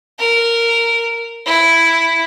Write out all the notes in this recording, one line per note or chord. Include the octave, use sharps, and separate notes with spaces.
A#4
E4